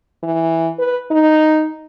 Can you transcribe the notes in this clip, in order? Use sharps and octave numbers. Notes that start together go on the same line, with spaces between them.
E3
B4
D#4